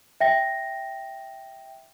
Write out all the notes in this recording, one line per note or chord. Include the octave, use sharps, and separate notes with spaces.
E5 G5 A#6